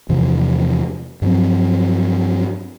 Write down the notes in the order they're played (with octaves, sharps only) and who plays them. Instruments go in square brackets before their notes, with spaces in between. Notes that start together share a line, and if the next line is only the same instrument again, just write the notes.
[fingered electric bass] E2 C3 E3 F3
G2 F3 F#3 C4